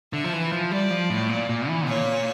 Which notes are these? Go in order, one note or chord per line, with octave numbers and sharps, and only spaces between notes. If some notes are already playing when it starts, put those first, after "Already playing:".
D3 E5
F3
E3
F3
G3 D5
F3
A2
A#2
A#2
E3
A#2 C#5